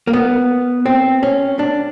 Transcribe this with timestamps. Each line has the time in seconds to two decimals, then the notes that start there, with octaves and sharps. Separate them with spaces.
0.07 A#3
0.13 B3
0.86 C4
1.23 C#4
1.59 D4